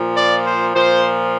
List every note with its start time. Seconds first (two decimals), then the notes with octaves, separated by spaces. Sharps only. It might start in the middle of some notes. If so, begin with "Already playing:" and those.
Already playing: A#2 F3
0.16 D5
0.46 C5
0.75 A#2 F3 C5